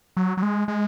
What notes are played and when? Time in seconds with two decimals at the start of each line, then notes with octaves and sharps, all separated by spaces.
0.17 F#3
0.37 F#3
0.42 G#3
0.68 G#3